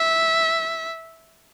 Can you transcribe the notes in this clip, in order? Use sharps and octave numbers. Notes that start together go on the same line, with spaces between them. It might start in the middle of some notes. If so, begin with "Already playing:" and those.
Already playing: E5